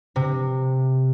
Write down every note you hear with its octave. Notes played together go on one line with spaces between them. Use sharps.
C3